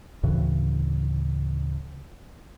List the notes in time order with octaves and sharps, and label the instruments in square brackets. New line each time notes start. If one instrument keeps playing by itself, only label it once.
[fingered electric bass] D2 A2 C#3 E3